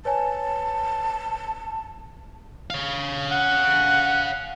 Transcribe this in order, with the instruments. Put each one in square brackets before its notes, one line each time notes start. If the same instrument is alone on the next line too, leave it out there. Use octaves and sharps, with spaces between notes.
[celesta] B4 C#5 G#5 [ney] A5
[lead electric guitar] C#5 F5
[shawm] F#5